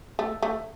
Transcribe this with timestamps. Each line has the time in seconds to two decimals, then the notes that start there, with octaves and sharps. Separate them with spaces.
0.19 A3
0.42 A3